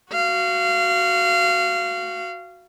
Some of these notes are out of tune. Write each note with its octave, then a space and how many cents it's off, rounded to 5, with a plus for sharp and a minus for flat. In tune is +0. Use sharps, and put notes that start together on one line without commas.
F#4 +0 F5 -25